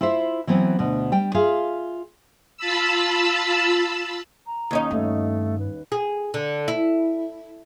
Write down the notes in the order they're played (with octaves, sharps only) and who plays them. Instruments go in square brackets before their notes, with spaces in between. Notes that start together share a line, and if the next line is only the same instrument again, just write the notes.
[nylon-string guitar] E4 F4 C5 E5
E3 F#3 B3 C4
D2 B2
G3 G5
F4 G#4 E5 F5
[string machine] F4 A5 B5 E6
[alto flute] A#5
[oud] D#2 C#4 D#4
[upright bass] G2 [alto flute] A3
[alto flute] B4
[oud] G#4
D3
E4